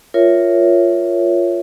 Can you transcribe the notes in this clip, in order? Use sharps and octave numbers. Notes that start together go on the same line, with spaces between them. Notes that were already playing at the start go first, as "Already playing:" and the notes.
F4 A#4 C#5 E5